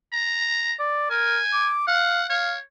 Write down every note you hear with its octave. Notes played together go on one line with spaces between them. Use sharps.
A#5
D5
A#4 G#5
D6
F5 F#5
C#5 F5